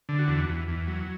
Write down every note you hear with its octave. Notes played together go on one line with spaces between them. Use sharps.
D3
F#4
E2
E2
E2
F#3